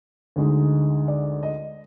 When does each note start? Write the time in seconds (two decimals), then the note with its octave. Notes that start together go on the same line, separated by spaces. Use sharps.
0.36 D2 D3 G#3 D#4
1.08 D5
1.43 D#5